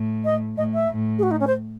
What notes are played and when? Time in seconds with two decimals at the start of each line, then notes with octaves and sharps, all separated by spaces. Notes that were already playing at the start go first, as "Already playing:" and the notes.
Already playing: A2
0.25 D#5
0.57 A2 D#5
0.73 E5
0.90 A2
1.18 G#4
1.23 F#4
1.31 D#4
1.40 C#4
1.47 C5